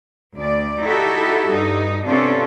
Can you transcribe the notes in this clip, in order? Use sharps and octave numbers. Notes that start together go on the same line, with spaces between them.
D2 D5
D#4 E4 F#4 G4 A4
G2 D#4
C3 B3 C#4 D4 F4 A4